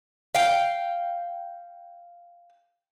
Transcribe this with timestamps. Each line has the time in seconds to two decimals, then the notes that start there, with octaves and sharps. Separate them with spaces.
0.35 F5 G5